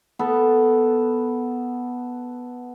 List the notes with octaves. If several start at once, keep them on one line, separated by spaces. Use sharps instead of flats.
B3 A4